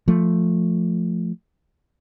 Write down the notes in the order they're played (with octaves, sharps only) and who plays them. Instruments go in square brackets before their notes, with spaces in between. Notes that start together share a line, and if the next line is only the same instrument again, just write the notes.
[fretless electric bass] F3 A3